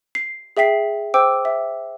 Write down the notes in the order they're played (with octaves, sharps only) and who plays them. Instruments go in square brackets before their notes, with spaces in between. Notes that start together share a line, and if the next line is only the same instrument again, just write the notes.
[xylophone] C7
G#4 E5 G5 B6 C7
C5 G5 D6 E6
E5